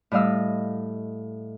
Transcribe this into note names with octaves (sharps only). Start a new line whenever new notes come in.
A2 G3 D#5 F5 E6